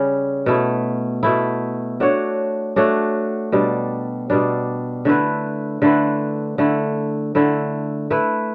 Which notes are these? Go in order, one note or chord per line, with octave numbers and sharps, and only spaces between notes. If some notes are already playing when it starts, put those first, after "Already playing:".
Already playing: C#3 G3 C#4
B2 A3 E4
B2 A3 E4
A3 D4 F#4 C#5
A3 D4 F#4 C#5
B2 G3 D4
B2 G3 D4
D3 A3 E4 B4
D3 A3 E4 B4
D3 A3 E4
D3 A3 E4
A3 E4 B4